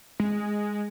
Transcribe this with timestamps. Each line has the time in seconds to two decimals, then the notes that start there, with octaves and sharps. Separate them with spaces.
0.20 G#3